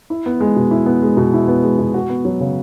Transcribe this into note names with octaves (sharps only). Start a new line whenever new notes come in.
E4
B3
G#3
B2
E4
B3
G#3
B2
E4
B3
G#3
B2
F#4
B3
F#3
C#3